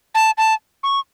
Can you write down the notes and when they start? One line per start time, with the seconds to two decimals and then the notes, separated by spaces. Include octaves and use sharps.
0.15 A5
0.38 A5
0.83 C#6